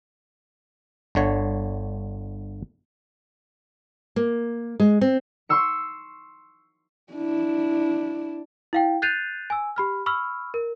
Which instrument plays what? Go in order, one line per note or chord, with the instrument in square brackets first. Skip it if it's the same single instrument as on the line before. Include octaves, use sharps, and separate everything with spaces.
[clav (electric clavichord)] G1 D3 C#5
[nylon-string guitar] A#3
G#3
C4
[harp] C6 C#6 E6 C#7
[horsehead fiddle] D4 E4
[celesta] E4 F5 G5
F#6 G6 A6 C7 D#7 F7
G#5 E6
G4 B5 F6
B5 C#6 E6 F6
A#4